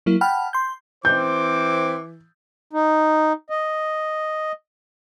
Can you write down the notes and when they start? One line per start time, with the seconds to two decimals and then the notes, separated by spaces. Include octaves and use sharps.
0.06 F#3 A#3 E4
0.21 F#5 G5 A5 B5 F6
0.53 C6 G6
1.05 E3 C4 C5 D6 G6
2.73 D#4
3.50 D#5